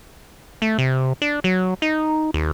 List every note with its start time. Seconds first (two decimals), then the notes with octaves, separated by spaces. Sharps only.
0.62 A3
0.78 C3
1.22 D4
1.44 F#3
1.82 D#4
2.34 D#2